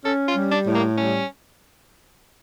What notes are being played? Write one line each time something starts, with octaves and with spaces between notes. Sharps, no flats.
C#4 A4
F4
G3
D4
A2
A#3
G3 C#4